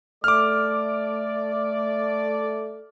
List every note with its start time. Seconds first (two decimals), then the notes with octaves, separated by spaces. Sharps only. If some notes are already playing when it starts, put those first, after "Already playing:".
0.24 A3 D5 D6 F6